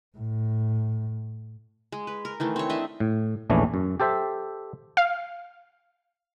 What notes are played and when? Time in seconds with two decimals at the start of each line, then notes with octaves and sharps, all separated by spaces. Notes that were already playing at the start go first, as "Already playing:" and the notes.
0.17 A2
1.92 G#3
2.07 B4
2.25 A#4
2.40 D#3 E3 A3
2.56 C4 C#5
2.70 D4 D#5 E5
3.00 A2
3.50 A#1 E2 E3 A3 C#4 D4
3.74 F#2
4.00 G4 A4 C5 E5
4.97 F5